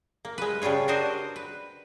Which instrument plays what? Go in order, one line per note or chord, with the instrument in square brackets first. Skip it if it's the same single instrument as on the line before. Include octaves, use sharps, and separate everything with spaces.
[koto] A#3
G#3 B4
C#3 G3 D4 F4 C#5
D4 F#4 A#4 C5 D#5
B4